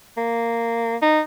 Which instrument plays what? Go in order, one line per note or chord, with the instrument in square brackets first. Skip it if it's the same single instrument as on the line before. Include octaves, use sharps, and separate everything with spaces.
[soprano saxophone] A#3
D#4